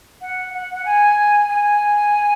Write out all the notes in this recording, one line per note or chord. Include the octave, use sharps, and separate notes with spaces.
F#5
F#5
F#5
G#5
G#5